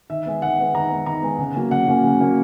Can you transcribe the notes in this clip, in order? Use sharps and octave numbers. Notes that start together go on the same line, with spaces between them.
D#3 E5
G#3 B3
D#3 F#5
G#3 B3
D#3 A#5
G#3 B3
D#3 A#5
G#3 B3
C#3
F#3 A#3 C#4
C#3 F#5
F#3 A#3 C#4
C#3
F#3 A#3 C#4